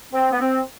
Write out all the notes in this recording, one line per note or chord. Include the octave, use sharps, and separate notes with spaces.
C4
B3
C4